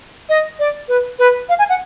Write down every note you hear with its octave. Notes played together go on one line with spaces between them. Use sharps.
D#5
D5
B4
B4
F5
G#5
F#5